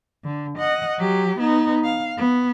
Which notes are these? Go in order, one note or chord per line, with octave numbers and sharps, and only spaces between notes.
D3
D#5 F#5
F#3 G4
B3 D#4
F5
B3